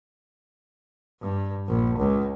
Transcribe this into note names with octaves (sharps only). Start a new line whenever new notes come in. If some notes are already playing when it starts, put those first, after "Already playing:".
G2
A#1
C#2